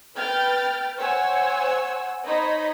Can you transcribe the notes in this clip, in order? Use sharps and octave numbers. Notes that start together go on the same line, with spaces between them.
B4 G5 F6 G6 A6
C5 C#5 F#5 G#5 E6
D#4 C5 C#5 D#5 B5